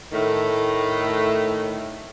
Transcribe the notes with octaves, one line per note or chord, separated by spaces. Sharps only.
A2 D#3 A3